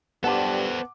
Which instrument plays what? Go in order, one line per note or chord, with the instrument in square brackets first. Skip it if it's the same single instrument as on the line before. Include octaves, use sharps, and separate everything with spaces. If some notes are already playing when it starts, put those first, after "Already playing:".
[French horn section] G2 G3 [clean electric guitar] B3 [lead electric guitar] A4 C5 [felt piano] F#5 A5 D6